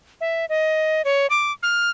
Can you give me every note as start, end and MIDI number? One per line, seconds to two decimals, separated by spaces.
0.21 0.45 76
0.49 1.02 75
1.05 1.27 73
1.30 1.52 86
1.63 1.90 89